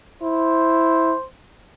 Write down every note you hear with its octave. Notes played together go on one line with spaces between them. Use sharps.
E4 C5